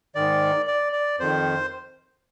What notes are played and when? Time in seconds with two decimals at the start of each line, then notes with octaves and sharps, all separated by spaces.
0.15 G#2 D#3 D5
0.67 D5
0.93 D5
1.19 F2 D#3 C5